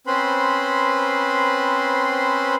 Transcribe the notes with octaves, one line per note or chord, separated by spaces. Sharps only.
C4 C#4 B4 C5 B5 C6